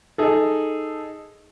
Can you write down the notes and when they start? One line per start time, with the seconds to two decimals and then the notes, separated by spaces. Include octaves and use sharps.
0.18 D#4 G#4 A4